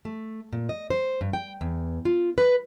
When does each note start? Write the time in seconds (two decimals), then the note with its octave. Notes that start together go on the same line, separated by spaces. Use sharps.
0.05 A3
0.53 A#2
0.69 D#5
0.90 C5
1.21 G2
1.33 G5
1.61 E2
2.05 F4
2.38 B4